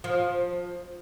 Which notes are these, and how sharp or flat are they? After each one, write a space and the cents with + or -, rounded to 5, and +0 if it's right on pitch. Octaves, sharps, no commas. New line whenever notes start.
F3 +20